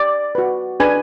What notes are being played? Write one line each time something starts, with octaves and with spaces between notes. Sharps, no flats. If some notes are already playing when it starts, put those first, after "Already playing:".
Already playing: D5
F#4 B4
D4 G#4 B4 G#5